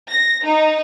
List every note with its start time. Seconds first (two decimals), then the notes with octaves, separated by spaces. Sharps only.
0.11 A#6
0.44 D#4